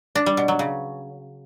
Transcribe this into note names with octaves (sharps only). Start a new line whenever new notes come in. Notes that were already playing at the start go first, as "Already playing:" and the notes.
D4
G3
B2
F#3
C#3